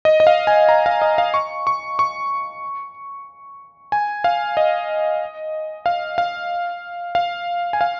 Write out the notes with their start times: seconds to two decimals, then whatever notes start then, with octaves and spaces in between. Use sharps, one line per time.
0.05 D#5
0.20 D#5
0.27 F5
0.47 G#5
0.69 A#5
0.86 F5
1.02 D#5
1.18 F5
1.34 C#6
1.67 C#6
1.99 C#6
3.92 G#5
4.24 F5
4.57 D#5
5.86 F5
6.18 F5
7.15 F5
7.73 G#5
7.81 F5